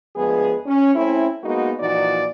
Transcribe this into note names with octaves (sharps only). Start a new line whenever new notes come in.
D2 F3 G#3 B3 G#4
C#4
A3 C4 C#4 E4
G#3 A#3 B3 D#4 F#4
A#2 E3 F3 D#4 F#4 D5